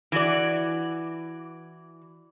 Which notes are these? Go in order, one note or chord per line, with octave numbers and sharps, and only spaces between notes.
E3 F#4 D5